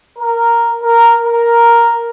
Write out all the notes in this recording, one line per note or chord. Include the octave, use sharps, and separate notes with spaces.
A#4
A#4
A#4